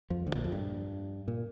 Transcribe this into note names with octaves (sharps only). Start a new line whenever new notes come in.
F2 F3
D2 D3
A#1 A#2
F2
G2
A#2